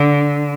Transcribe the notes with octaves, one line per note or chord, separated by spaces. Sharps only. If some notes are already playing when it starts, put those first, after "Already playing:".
Already playing: D3